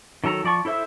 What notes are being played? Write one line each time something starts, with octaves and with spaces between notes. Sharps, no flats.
D#3 F#3 A4 A#5
F3 D5 A5 C#6
E4 A4 C5 E5 E6